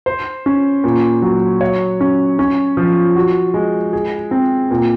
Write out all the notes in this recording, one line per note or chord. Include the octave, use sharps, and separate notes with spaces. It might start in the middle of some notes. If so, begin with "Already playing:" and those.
C5
C#4
A#2
F#3
C#5
C#4
C#4
F3
F#4
G#3
G#4
C4
A#2